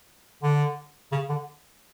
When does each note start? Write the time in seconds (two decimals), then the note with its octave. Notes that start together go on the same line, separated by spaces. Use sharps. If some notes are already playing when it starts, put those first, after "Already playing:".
0.43 D3
1.12 C#3
1.29 D3